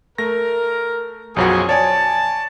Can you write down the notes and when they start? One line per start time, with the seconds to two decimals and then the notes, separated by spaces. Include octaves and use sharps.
0.18 A3 A#4 A#6
1.36 B1 F#2 F3 C#4 F#4 G#4
1.69 C#5 D5 G#5 A5